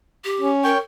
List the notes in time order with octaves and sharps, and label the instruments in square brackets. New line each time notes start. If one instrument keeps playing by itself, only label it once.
[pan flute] G4
[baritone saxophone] C#4
[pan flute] A#4 [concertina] C#5 G5